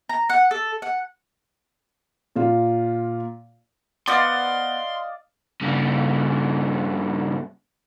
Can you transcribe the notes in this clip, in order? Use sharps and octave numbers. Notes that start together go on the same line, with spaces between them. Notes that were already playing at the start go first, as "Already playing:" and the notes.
A#5
F#5
A4
F#5
A#2 F4
B3 C5 D5 D#5 F5 C6
G2 C#3